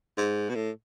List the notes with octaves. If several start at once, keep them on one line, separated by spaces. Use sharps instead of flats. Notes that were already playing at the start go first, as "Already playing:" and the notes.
G#2
B2
A2